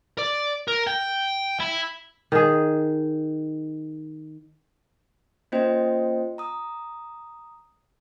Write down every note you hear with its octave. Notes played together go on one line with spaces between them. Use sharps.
D5
A#4
G5
E4
D#3 G#4
A#3 C#4 F4 C5 D#5 G5
A#5 D#6